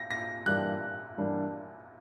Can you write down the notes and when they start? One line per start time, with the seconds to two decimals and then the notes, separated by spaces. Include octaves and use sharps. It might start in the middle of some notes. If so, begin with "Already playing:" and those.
Already playing: A#6
0.11 A#6
0.46 G2 E3 G3 A#3 D4 F#6
1.18 G2 E3 G3 A#3 D4